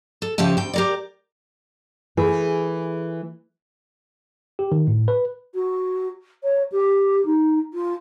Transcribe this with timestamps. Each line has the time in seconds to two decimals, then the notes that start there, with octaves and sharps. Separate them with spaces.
0.22 A4
0.38 C#3 F3 G4 E5 A5
0.57 D2 G5
0.73 G4 A#4 D5
2.17 E3 A3 G#4
4.59 G4
4.72 D#3
4.88 A2
5.08 B4
5.54 F#4
6.43 C#5
6.71 G4
7.25 D#4
7.73 F4